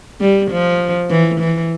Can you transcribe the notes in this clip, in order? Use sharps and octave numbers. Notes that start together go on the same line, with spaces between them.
G3
F3
E3
E3